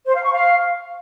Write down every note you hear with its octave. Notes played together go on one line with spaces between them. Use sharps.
C5
F5
C#6
F5